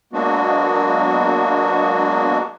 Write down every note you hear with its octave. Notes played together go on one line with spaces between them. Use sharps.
F#3 G#3 A#3 B3 D4 F#4